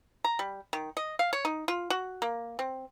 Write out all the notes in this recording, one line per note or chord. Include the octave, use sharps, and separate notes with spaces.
A#5
G3
D#3
D#5
F5
C#5
D#4
F4
F#4
A#3
C4